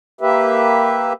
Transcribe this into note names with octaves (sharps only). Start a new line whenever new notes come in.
A#3 G4 B4 E5